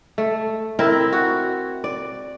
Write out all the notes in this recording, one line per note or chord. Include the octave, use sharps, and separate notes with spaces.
A3
C4 E4 A#4
F#4
D5